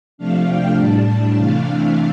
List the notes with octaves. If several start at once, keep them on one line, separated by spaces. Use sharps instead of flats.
C3 F3 A3 D4 F5
G5
A2 G3 D4 A5
C3 E3 A3 D4 F5